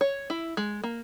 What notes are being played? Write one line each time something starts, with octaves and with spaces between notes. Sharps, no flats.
C#5
E4
G#3
A#3